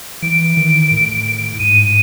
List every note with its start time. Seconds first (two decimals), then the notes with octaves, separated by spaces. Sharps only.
0.22 E3 D7
0.57 D#3
0.91 A2
1.59 G#2 D#7